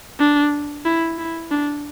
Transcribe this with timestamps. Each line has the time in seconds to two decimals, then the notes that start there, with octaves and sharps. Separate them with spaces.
0.19 D4
0.85 E4
1.18 E4
1.51 D4